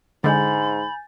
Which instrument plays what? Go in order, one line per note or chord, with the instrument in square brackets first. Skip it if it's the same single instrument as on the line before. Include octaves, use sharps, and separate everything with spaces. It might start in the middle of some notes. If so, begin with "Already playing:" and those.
[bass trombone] G#2 [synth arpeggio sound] D3 G#3 [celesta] G#5 G6 A6 [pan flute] B5